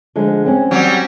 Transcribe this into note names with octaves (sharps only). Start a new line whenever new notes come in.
D3 F3 G#3
C4 C#4
F#3 G3